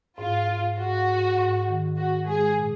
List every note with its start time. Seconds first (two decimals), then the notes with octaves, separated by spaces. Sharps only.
0.18 G#2 F4
0.48 G#2
0.78 G#2 F#4
1.07 G#2
1.37 G#2
1.67 D#3
1.97 G#2 F#4
2.26 G#3 G#4
2.56 A#2